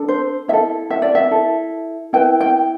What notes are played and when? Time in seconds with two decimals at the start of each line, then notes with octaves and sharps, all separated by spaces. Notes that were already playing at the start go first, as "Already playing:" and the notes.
Already playing: D4 A4
0.08 C5
0.48 E4 E5
0.53 A4
0.91 E5
1.02 D5
1.15 E5
1.31 E4 A4
2.13 E4 B4 G5
2.41 G5